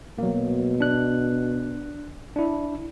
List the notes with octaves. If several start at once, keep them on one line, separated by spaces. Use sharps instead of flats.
B2 F#3 A#3
D4 F#6
D4 E4